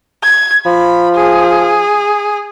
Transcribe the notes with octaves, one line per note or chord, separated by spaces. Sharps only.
G#6
F3 B5
G#4